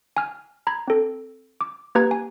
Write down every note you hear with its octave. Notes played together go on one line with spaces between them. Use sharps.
G#5 F6
A#5 B5 G#6
C4 A4
D6
A#3 G4 B4 A#5 G#6
G#5